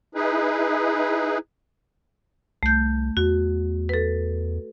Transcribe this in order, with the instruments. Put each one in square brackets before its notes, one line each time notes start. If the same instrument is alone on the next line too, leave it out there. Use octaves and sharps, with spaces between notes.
[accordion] D#4 E4 G#4 B4
[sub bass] C2 [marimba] A3 G6
[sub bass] E2 [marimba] F#4
[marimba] A4 B4